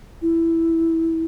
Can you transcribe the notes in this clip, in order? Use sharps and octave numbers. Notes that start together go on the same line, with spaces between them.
E4